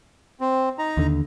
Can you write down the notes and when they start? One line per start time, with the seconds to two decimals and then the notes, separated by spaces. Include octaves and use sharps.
0.41 C4
0.79 D#4 A#5
0.97 D#2 D3